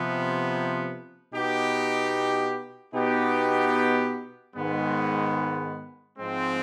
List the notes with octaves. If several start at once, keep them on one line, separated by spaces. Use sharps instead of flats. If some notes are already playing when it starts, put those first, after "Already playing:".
Already playing: C3 F3 B3
B2 B3 D#4 G4
B2 B3 D#4 G4
G#2 D#3 G#3 B3
G#2 F3 G#3 C4